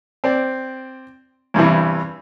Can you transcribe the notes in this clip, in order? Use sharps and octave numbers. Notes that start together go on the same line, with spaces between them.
C4 D5
E2 G2 C3 E3